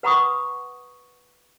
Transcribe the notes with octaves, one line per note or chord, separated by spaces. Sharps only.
B4 F#5 A#5 B5 C#6 D#6